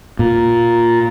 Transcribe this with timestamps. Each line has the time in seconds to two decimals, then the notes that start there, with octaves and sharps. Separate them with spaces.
0.19 A#2